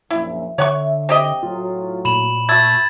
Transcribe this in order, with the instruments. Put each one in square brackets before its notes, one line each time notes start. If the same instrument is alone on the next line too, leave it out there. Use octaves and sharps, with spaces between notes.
[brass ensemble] A#1 F#2 [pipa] E4
[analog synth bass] D3 [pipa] C#5 F#5 C#6 [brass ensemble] E5
[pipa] C4 G4 D#5
[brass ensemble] A2 F#3 [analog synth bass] F4
[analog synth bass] A#2 [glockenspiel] B5 E7 F#7
[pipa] A3 F#4 [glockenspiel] E6 G#6 A6